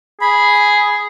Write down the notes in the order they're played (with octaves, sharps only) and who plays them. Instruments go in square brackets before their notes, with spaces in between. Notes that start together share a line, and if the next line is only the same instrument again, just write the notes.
[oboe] G#4 [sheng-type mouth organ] B5